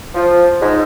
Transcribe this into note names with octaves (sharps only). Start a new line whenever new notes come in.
F3
G#2